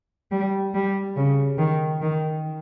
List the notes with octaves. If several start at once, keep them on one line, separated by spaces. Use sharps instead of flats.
G3
G3
C#3
D#3
D#3